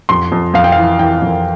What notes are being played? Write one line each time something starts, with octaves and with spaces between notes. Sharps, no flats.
F2 C6
F2
F2 F5
G5
E3 F5
E3 G5
F2